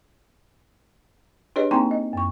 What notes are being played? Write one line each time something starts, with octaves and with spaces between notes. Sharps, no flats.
D4 G4 G#4 B4 C#5 D#5
A#3 C4 D#4 G5 A#5 C6
D#5
F#2 C#6